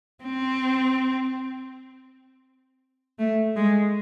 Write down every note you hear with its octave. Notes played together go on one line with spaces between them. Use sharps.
C4
A3
G#3